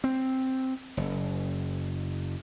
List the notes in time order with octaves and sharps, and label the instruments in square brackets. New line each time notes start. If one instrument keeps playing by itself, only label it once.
[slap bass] C4
F#1